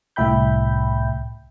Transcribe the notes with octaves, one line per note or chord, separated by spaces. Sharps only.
C2 A2 E5 G5 B5 G6